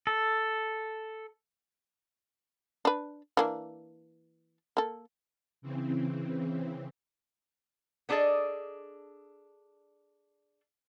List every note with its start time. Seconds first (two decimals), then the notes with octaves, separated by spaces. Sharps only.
0.07 A4
2.85 D4 B4
3.37 E3 A#3 D4
4.77 A#3 A4
5.62 C#3 E3 C4
8.09 B3 D4 G#4 A4 D5 D#5